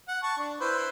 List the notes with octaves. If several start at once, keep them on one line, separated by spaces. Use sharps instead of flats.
F#5
A5 C#6
D4
E4 B4 C5